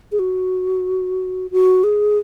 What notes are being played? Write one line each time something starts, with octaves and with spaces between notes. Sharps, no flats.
G#4
F#4
F#4
G#4